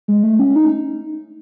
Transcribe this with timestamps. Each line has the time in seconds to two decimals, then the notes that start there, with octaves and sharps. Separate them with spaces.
0.08 G#3
0.23 A3
0.39 C#4
0.56 D#4